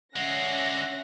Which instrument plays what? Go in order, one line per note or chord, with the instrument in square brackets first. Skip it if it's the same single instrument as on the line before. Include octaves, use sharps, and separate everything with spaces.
[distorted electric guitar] D3 G#3 [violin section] C#4 E5 A#6 [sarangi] F#5